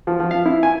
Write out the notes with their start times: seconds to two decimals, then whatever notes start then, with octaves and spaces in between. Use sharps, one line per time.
0.07 F3
0.20 F3
0.31 F5
0.46 E4
0.63 G#5